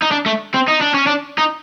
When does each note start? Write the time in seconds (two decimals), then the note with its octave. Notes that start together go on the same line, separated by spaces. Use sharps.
0.02 D#4
0.11 D4
0.26 A3
0.54 C4
0.68 D#4
0.81 D4
0.94 C#4
1.06 D4
1.38 D#4